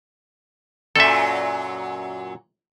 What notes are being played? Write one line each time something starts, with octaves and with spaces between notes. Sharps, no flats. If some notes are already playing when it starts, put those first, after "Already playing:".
F#2 A#2 F#3 A4 E5